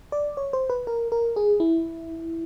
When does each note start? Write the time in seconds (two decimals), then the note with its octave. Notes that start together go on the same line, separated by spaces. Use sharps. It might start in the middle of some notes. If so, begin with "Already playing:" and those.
0.12 D5
0.37 C#5
0.53 C5
0.70 B4
0.87 A#4
1.12 A#4
1.36 G#4
1.60 E4